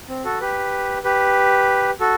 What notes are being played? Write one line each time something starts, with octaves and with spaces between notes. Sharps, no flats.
C4
F#4 A4
G4 B4
G4 B4
F#4 A4